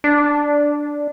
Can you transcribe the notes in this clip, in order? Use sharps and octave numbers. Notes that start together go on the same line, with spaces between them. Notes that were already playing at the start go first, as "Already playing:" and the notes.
D4